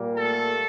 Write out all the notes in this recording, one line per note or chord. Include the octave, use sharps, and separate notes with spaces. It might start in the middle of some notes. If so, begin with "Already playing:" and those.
Already playing: A#2 G3 A#3
A3 A4